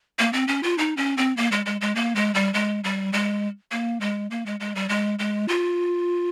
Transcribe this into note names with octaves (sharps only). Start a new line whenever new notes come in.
A#3
C4
C#4
F4
D#4
C#4
C4
A#3
G#3
G#3
G#3
A#3
G#3
G3
G#3
G3
G#3
A#3
G#3
A#3
G#3
G#3
G3
G#3
G#3
F4